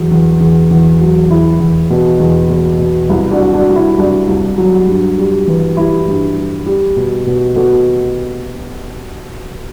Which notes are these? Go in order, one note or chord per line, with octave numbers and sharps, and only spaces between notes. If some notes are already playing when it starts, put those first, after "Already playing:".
Already playing: E2 F#3
E2
E2
E2
F#3
E2 E4
E2
B2
E2
B2
B2
C2 E4
D4 F#4
C2
D4 F#4
C2
E4
C2 D4 F#4
C2
F#3
G2
G3
E3
G3 E4
G2
G3
G3
B2
B2
B2 F#4 A4